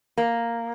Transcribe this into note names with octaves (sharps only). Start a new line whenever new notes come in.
A#3